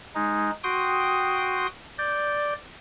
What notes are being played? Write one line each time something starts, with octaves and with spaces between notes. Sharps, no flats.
G#3 D#4
F#4 G5 C6 D#6
D5 G6